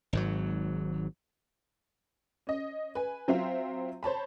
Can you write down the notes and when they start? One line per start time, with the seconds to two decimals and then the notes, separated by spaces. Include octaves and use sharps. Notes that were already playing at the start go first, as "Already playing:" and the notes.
0.13 G#1 G#2 F#3
2.47 C#4 D#5
2.95 B4 G#5
3.28 F#3 C4 F4 E5 F5
4.03 C5 C#5 A5 B5